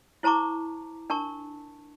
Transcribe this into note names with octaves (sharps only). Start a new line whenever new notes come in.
E4 C5 A5 A#5 C#6 D6
D4 A#4 A5 C#6